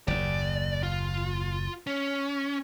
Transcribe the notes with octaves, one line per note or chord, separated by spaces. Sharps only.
F#1 D#2 D5
F4
C#4